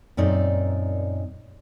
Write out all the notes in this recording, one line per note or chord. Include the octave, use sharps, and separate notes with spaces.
F#2 A#2 C4 D#4 D5